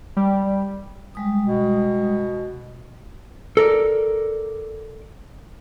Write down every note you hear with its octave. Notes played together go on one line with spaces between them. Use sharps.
G3
G3 G#3 D#6
B2
A4 A#4 D5